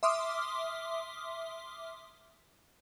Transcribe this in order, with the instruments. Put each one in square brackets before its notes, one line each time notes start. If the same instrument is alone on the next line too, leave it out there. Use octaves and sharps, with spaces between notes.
[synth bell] E5 C6 D6 D#6 F6